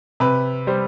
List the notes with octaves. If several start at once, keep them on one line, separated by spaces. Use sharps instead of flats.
C3 B4
G3 C5